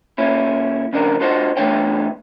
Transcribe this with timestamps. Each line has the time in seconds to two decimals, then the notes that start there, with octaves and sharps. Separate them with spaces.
0.18 A#2 C#4 E4
0.93 F2 C#3 D4 A#4
1.20 D4 F4 F#4 C5 D#5 F#5
1.57 E3 A3 B3 D4 C#5 G5